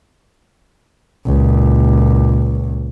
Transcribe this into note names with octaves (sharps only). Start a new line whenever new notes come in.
C#2 A#2